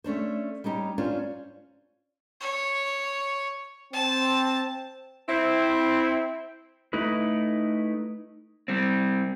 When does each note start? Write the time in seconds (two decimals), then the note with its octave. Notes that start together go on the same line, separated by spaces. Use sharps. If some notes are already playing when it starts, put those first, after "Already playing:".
0.04 A3 C#4 D4 C5
0.64 G3 C#4 D#4 G4
0.98 C#4 D4 F4 C5
2.41 C#5
3.93 C4 A5
5.28 C4 E4
6.93 A3 D#4 E4 B4
8.68 G3 C4